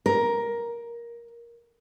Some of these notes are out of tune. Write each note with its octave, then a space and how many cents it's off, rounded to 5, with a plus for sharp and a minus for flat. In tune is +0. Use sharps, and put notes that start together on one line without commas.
A#4 +10